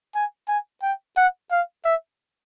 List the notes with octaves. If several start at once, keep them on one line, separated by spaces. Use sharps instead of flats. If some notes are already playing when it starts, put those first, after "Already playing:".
G#5
G#5
G5
F#5
F5
E5